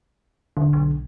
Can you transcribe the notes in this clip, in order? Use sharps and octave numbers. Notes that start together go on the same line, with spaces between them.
D#1 D3
B1